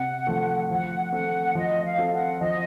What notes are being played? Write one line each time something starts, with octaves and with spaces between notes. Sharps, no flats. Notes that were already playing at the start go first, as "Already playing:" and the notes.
Already playing: C3 F#5
F3 A3
F3 F#5
A3 C4 F#5
F3 D#5
F5
C4 F4 A4
F#5
F3 D#5